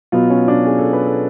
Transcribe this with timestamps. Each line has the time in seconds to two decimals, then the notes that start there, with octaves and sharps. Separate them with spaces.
0.12 B2 F#3 B3 F4
0.30 C#4
0.48 D4
0.66 G#4
0.79 A4
0.93 B4
1.06 A4